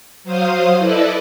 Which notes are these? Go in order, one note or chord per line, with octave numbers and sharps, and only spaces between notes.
F#3 C5 F5 D#6
E4 A4 B4 D5 D#5